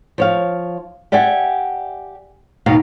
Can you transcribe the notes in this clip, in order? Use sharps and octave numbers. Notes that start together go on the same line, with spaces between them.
F3 C#5 F5
G4 D5 E5 F#5 G#5
D#2 B2 F5